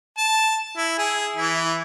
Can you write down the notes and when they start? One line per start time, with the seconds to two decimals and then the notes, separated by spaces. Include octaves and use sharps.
0.18 A5
0.77 E4
0.99 G#4
1.36 E3 E4